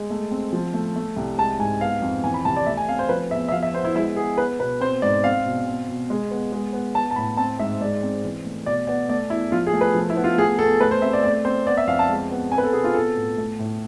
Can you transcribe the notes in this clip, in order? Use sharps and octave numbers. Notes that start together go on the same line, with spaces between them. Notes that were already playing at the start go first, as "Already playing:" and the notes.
Already playing: G#3
A3
C4
F3
A3
A3
C2
G#3 A5
G#2 G#5
B3 F5
F2
E3 G#5
B5
C2 A5
D5
A3 E5
G#5
C4 F5
C5
F3 B4
E2 E5
E5
F3 F5
E5
B3 C5
E4
G#3 E4
B3 G#4
B3 B4
B2 B4
C4 C5
G#2 D5
C4 F5
B2
C4
B2
G#3
B3
G#3
B3
B3 A5
A5
A2 B5
C4 A5
G#2 E5
G#3 D5
C4
E3
A3
B2 D5
B3 D5
A3 D5
E2 E4
F3 F4
G#4
A3
B4
F3
E4
B3
F4
A3 G#4
E2 A4
A3 B4
C5
C4 E5
D5
A3 D5
C4 C5
B3 D5
E5
F2 F5
A5
G#3
B3
C4 G#5
B4
A4
B2 G#4
F4
B3 A4
A2
A3
A2